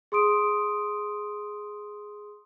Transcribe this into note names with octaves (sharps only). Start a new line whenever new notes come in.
G#4 C6 D#6 D7